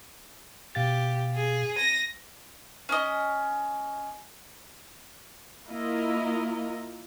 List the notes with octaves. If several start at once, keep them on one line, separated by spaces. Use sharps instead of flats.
B2 G4 F5 A6
G#4
A#6 D#7
C#4 D#5
A#3 E4 F4 A#4 D#5 A#5